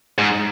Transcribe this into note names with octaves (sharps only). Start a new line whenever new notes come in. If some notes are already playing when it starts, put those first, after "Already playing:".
G#2